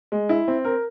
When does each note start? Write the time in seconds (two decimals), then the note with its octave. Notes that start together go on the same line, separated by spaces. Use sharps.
0.12 G#3
0.29 E4
0.48 C4
0.65 A#4